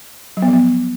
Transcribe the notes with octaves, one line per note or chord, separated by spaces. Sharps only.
F#3
B3
F3
B3